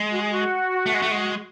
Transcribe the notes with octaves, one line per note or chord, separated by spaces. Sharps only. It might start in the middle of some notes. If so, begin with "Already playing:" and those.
Already playing: G#3
F#4
G#4
F#4
A3
G#3
A3
G#3